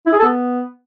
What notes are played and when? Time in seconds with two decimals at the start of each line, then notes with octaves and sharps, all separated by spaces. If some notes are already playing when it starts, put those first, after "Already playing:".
0.07 E4
0.13 G#4
0.19 A4
0.26 B3